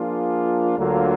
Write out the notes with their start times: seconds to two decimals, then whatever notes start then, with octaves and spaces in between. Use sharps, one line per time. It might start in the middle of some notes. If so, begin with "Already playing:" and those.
Already playing: F3 A#3 D4 F4 G#4
0.78 D2 D3 F#3 A#3 F4